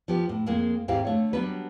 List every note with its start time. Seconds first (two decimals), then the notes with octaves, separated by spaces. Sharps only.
0.08 F3 B3 G4
0.29 A2
0.46 F2 G#3 A#3 G#4
0.88 D#2 G#2 C4 E4 G4 F5
1.05 D3 A3 C#5
1.33 F#3 G3 B3 D4 B4